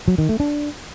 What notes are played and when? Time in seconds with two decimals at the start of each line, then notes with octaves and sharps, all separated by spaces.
0.08 F#3
0.18 D#3
0.29 A3
0.40 D4